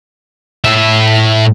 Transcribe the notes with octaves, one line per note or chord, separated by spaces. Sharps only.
A2 E5